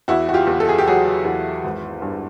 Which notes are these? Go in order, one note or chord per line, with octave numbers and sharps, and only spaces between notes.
E2 E4 F#4
F#4
F4 G4
E2
A4
G#4
G4
F#3 F#4 G#4
E2
G#1
G2